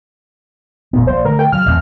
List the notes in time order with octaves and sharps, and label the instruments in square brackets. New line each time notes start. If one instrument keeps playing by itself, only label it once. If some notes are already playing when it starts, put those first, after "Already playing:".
[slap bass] F1 A#2 B3
[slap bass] A#1 [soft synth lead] C5
[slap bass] D3 A3 [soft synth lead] A#4
[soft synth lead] G5
[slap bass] C#3 F#3 [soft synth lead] F6
[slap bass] A1 E2 C4